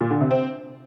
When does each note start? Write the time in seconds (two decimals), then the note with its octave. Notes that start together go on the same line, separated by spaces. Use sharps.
0.01 A#2
0.11 D3
0.21 C3
0.31 C4